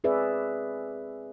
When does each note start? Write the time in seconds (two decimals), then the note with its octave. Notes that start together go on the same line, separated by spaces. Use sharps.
0.04 C4 G#4 B4 D5 E5